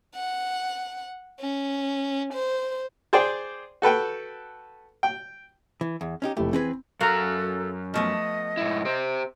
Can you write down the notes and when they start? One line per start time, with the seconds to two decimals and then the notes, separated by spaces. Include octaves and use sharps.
0.15 F#5
1.40 C#4
2.33 C5
3.13 G#4 C5 D5 G5
3.82 F#4 A4 B4 G5
5.03 G5
5.81 E3
6.01 E2
6.22 C#4 D#4 G4
6.37 F1 A3 E4 G4
6.53 E3 C4 G#4 B4
7.00 F#2 F#4 A4 A#4 F5 A#5
7.94 F3 A3 B3 D#5
8.57 G#2 E4
8.85 G4 C5